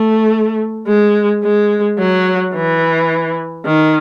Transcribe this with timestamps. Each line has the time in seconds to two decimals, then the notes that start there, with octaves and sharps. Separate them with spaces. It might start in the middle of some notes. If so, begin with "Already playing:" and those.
Already playing: A3
0.88 G#3
1.43 G#3
1.99 F#3
2.54 E3
3.65 D#3